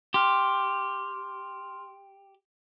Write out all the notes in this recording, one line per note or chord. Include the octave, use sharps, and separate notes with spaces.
G4 C6 F6